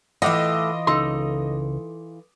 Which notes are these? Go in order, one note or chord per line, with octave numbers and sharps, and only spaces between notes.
A2 E3 A3 F4 D#5 F#5 D6
C#2 D#4 A4 C6